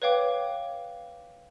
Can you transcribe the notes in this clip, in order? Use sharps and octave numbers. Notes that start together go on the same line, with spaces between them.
B4 C#5 F5 G5 D6